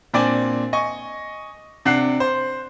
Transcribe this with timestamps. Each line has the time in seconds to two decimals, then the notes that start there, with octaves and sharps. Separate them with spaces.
0.14 A#2 C4 D4 D5 G#5
0.73 D#5 G#5 C#6
1.85 C3 D4 F#5 F#6 C7
2.20 C5